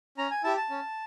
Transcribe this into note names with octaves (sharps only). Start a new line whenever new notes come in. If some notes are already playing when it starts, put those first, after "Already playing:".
C#4 A#5
G#5
E4 G4 A5
A5
C#4